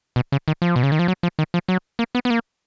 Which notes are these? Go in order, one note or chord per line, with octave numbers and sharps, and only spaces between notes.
B2
C#3
D#3
F3
B2
C#3
D#3
F3
F#3
F3
D#3
F3
F#3
A#3
B3
B3
A#3